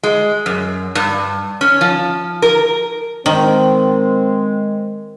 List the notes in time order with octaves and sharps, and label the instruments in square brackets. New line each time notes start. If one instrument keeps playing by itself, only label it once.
[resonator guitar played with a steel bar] G#3
F#2
G2
C#4
F3
A#4
[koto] D#3 [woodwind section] G#3 [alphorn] C4